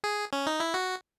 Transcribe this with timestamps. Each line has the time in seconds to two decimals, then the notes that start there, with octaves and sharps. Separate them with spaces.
0.04 G#4
0.33 C#4
0.47 D#4
0.60 E4
0.74 F#4